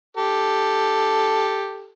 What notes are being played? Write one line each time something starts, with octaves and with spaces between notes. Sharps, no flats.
G4 A4